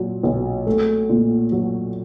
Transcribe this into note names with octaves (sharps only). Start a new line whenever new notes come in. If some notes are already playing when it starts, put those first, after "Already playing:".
Already playing: A#2 F#3
B1
A3
A#2
F#3